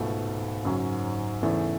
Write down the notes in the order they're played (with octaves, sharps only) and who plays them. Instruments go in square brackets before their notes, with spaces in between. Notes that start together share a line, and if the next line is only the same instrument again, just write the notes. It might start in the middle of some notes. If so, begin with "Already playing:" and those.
Already playing: [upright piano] C#2 B2 A3 [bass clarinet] G#2
[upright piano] F#2 C#3 F#3 C#4
E2 C#3 E3 A3